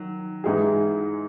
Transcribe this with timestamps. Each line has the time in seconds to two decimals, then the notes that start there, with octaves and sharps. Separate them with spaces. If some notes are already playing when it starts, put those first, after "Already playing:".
Already playing: D#3 F#3
0.44 G#2 E3 G#3 D#4 G#4